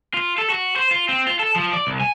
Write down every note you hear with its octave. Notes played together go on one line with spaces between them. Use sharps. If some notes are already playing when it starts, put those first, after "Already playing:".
F4
A4
F#4
C5
F4
C4
F4
A4
F3
D5
C2
G#5